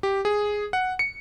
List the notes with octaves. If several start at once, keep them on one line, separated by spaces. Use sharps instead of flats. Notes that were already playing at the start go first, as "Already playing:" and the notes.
G4
G#4
F#5
C#7